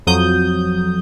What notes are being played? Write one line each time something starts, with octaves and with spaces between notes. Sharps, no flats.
F2 F#3 D#6 G6